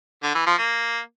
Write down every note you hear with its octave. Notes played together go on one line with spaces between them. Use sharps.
D3
E3
F3
A#3